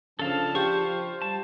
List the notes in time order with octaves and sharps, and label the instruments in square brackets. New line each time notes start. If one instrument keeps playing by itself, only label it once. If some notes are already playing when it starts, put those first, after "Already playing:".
[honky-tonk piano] C#3 [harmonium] F3 D4 A5 [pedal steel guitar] A4 F5
[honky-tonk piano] F4 G4 [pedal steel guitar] C5 C#6
[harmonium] G3 [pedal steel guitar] A5